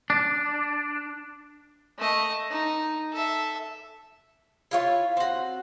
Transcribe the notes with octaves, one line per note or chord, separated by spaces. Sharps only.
D4
A3 D#5
D#4
A4 E5
E4 F4 C#5
C4 F#4